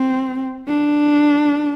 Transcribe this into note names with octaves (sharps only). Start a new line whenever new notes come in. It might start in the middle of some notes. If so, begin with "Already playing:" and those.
Already playing: C4
D4